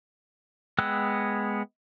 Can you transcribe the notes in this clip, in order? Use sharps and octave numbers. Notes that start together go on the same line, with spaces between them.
G#3 B3 G5 E6 F#6